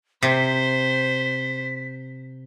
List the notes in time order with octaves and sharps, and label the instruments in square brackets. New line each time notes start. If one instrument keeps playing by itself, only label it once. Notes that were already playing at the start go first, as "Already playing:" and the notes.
[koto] C3 [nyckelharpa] C5 [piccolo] B6